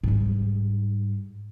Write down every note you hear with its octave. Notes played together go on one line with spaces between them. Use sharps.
G#2 G3